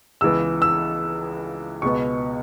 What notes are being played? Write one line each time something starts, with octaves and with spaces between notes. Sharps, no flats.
C#2 C#3 E3 B3 E6
E6
C#2 B2 B3 C#6